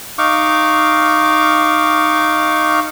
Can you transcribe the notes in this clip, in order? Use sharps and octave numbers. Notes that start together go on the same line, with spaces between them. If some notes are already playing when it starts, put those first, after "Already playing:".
D#4 F5 C#6 D6